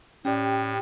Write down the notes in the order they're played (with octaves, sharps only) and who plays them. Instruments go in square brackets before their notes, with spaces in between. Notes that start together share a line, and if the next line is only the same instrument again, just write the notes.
[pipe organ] A2 [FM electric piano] C#4 D5 [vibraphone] G4 G5